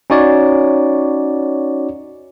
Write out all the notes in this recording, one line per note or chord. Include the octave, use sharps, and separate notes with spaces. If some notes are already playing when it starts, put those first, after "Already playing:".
C#4 D#4 F#4 C#5 D5